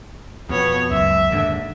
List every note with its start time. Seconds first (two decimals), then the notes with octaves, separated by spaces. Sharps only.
0.49 F2 B2 B3 C#5
0.91 C#2 F#2 E5
1.31 D#2 G#2 D3